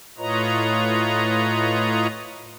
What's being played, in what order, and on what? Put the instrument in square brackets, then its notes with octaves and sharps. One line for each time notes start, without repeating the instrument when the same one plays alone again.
[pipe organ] A2 F4 B4 C#5 D#5 A#5